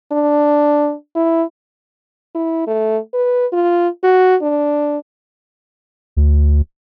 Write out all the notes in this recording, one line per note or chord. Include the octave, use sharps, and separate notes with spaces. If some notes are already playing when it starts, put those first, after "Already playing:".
D4
E4
E4
A3
B4
F4
F#4
D4
D2